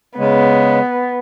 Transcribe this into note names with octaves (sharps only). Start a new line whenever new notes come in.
C#3 G#3 B3